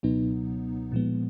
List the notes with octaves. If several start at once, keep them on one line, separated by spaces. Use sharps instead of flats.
C#2 B2 F#3 B3 D#4
A#2 F3 G#3 B3